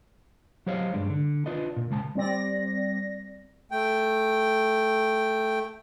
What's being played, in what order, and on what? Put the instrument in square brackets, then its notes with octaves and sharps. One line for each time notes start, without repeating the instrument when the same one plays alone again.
[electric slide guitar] F#3 G4 C5 C#5 D#5 F5
G2 G#3 D4
D3
D4 F4 B4 D5 D#5
A#2
C#3 G#3 A5
[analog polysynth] G3 C4 D5 A#6
[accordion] A3 G5